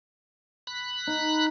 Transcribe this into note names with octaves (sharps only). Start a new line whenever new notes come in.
B5 F#6
D#4